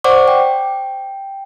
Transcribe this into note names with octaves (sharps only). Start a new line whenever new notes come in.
C5 D5 F#5 C#6 D6
G5